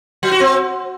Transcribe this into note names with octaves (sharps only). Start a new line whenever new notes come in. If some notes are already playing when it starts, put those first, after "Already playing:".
F#3
F#4
C4